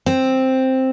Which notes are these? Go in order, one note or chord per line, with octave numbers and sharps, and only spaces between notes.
C4